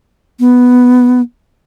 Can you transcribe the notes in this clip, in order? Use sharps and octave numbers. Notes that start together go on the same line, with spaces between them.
B3